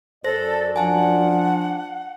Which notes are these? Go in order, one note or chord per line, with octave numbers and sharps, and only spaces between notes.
F#2 A4 C5 D5 A#6
F3 D4 F#5 G#5 A5